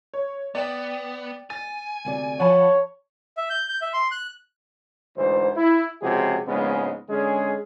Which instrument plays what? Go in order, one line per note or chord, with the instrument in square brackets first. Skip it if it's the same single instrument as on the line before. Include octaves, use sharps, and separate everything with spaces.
[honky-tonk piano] C#5
[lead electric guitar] B3 [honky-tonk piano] D5 G5 E7
[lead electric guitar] G#5 [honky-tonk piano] A6
[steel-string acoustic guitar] D2 C3 D5
[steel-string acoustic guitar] F3 F4 [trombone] C#5 [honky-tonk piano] F#5 A5 B5
[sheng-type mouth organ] E5
G6
G6
E5
C6
F#6
[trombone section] D2 G#2 E3 C5
E4
C#2 C3 F3 F#4 G#4
A#1 G#2 C#3 G#3 B3
D3 G#3 C#4 G#4